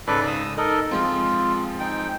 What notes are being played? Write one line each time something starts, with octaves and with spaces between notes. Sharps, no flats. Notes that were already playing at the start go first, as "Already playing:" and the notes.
G#2 C#3 A4 B4 D5
D#6 E6
D#4 A4 A#4 D#5
F3 G#3 C4 F4
D#4 G5